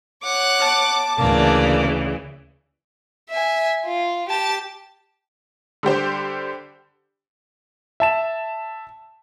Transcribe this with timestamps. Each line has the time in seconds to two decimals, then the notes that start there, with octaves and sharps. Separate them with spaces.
0.23 C#5 F#5 D6
0.60 A5
1.18 D2 C#3 E3 A#3 D5
3.30 E5 G#5
3.86 F4
4.29 G4 A5
5.83 D3 G3 G4 C5
8.00 E5 A5 E7